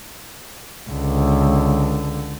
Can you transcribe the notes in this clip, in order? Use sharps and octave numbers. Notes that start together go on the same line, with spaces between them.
C#2 D3